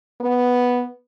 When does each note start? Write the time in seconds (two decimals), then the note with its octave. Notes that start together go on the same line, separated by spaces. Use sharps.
0.21 B3